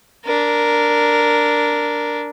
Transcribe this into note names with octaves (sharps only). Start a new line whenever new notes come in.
D4 A#4